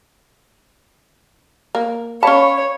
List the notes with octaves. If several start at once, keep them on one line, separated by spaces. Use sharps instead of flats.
A#3
C#4 G#4 C#5 F5 A5 B5